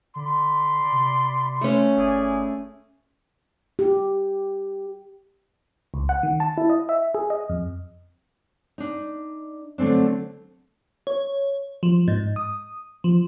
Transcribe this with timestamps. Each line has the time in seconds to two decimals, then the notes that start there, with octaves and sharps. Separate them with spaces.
0.16 D3 D5 B5 C6
0.92 C3
1.61 A3 C#4
1.97 G1 E4 G#4 D5
3.79 G4
5.94 C#2
6.09 F#5
6.23 D#3
6.40 A5
6.57 E4
6.70 D#5
6.89 E5
7.15 G#4
7.30 D#5
7.49 F2
8.78 D4 D#4
9.78 D3 F#3 A3 C4 D4
11.07 C#5
11.83 F3
12.08 G#2
12.36 D#6
13.04 F3